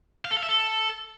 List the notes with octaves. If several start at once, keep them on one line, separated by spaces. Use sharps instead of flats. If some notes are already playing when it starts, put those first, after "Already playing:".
F5
A4
F5
E5
A4